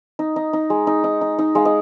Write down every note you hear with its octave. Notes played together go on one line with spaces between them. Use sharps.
D#4
D#4
D#4
G#3
D#4
D#4
D#4
D#4
G#3 F5
D#5